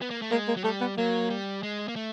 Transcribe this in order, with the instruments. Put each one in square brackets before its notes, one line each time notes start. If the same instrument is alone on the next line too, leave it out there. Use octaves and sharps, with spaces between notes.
[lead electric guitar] B3
A#3
A3
[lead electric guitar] G#3 [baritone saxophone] A#3
[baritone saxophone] A#3
[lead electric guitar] F#3
[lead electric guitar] G3 [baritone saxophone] A3
[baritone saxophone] B3
[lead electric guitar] F#3 [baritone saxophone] A#3
[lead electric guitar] G3
G#3
A#3
A3